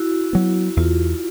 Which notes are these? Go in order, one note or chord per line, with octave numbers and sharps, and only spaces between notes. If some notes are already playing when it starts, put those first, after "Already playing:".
Already playing: E4 F#4
F#3 B3
E2 F4